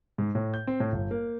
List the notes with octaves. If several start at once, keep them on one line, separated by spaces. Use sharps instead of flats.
G#2
A2
G6
C4
A2
G1
A#3